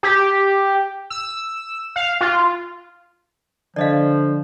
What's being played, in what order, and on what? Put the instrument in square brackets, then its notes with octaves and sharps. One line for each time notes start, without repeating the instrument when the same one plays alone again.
[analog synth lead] G4
E6
F5
F4
[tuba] D3 [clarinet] F3 [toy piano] D5 D#5 F5